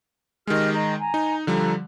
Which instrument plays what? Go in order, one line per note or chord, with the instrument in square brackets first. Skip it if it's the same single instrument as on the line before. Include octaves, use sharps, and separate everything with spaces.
[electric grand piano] D#3 G#3 [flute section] G4 D#5 F6
[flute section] D#5 A#5
G#5 A#5
[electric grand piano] D#4
[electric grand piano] D3 F3 G3 [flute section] A4 A#5